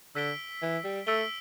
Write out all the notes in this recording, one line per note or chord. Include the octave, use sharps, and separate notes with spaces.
D3 E6 B6 D7 G7
E3
G3
A3 E6 B6 D7 G7